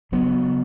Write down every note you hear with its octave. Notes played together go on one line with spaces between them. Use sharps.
C#3 F#3 B3